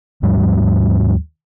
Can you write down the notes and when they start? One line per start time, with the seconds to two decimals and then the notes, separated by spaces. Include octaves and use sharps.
0.22 D#2 G#2 F3 G3